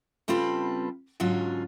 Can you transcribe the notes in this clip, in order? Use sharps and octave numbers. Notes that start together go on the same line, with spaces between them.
C#3 G3 C4 F4 A4 B4
G#2 D3 F#3 C#4 F4